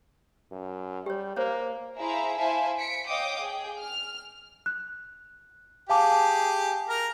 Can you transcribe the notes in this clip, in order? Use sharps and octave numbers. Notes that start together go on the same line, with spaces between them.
F#2
G3 G4 C#5
A#3 C5 C#5
E4 G#4 C5 E5 F5 A#5
E4 C5 E5 F5 G#5 A5
B6 C#7 D7
C#5 D#5 F5 G5 D6 D#6
G#4 G5
F6
F#6
G4 G#4 F5 A5 D6
A#4 A#5